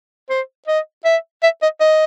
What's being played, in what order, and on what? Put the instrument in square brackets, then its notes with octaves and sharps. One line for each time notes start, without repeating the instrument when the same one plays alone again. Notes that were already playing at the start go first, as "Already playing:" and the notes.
[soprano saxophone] C5
D#5
E5
E5
D#5
D#5